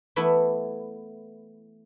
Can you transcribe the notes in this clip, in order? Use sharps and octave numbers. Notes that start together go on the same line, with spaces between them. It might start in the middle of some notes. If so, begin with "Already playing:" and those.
E3 A3 B3 E4